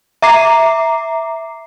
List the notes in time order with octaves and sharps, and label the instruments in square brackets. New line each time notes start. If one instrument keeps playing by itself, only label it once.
[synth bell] E5 A#5 D6 C7